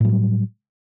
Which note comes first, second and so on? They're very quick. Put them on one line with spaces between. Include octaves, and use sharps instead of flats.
A2 F#3 G3